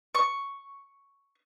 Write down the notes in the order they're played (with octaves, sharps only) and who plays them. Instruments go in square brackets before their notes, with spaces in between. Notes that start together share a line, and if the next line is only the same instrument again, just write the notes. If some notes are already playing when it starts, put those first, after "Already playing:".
[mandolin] C#6